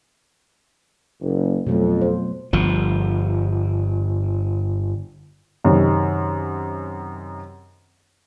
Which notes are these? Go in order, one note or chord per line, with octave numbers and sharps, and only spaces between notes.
F#1
F2 B2 F#3 A3
C5
G1 F3
F#2 C3 D#3